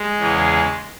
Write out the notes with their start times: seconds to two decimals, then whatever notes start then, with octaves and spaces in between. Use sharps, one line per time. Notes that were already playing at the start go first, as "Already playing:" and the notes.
Already playing: G#3
0.19 E2 C#3 E3